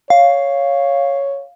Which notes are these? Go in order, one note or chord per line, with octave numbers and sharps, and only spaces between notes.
C#5 F5